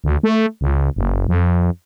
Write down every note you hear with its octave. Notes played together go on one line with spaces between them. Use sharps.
D2
A3
C#2
F#1
F2